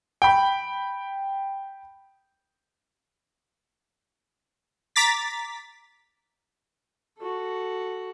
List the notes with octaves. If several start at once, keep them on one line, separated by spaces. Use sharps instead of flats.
G5 B5
A#5 D6 A6 B6
F#4 A4